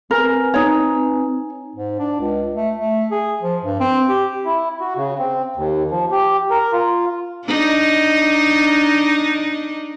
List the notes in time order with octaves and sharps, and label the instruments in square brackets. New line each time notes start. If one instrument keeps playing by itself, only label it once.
[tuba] C4 [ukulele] A#4 [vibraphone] B4 G#5
[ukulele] D#4 C#5
[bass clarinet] G#2
D4
C#2
A3
A3
G#4
F3
G2
C4
G4
[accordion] E4
F#4
C#3
C4
D#2
F3
G4
A#4
F4
[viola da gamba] D4 D#4